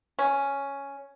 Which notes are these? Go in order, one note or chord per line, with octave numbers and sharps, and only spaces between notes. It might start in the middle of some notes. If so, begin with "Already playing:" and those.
C#4